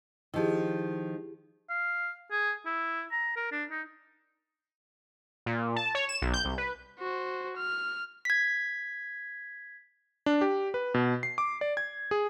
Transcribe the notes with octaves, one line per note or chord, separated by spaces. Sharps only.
D#3 F3 E4 G4 G#4
F5
G#4
E4
A#5
A#4
D4
D#4
A#2
A5
C#5
E7
B1
G6
C2
B4
F#4 C5
F6
G#6 B6
D4
G4
B4
B2
C7
D6
D5
G#6
G#4